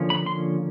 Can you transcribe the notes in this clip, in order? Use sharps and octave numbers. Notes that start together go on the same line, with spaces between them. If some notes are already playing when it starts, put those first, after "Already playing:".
Already playing: D3 F3 A#3 C#4
B5
C6